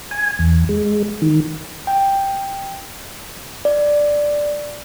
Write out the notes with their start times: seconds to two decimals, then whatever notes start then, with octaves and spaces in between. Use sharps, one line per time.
0.11 G#5
0.39 E2
0.69 G#3
1.22 D#3
1.87 G5
3.65 D5